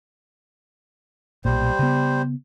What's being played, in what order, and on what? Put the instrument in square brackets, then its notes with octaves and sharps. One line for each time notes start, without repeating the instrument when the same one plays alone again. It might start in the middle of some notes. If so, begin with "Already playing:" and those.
[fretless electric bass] B1 A#2 [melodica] G3 C5
[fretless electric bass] C#3 B3